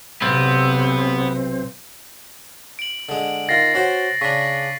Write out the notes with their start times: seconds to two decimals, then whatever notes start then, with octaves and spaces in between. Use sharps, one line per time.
0.22 B1 C3 B3 C4
2.79 D7 F#7
3.09 D3 G#3
3.49 D#3 F4 A6 A#6 C7
3.74 C#4 F#4 C5
4.21 C#3 D4 C#6 B6